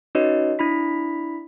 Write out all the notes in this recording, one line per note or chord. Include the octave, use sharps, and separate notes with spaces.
C#4 D#4 F#4 B4 C#5 D#5
D4 E4 B5 B6